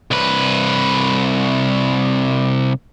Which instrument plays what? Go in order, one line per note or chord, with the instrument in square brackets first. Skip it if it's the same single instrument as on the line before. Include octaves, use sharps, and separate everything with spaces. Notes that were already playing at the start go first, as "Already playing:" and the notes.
[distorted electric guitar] C2 B4